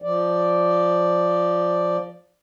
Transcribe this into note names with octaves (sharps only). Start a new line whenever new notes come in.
F3 D5